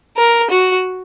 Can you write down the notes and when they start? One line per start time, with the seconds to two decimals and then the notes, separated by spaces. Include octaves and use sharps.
0.17 A#4
0.51 F#4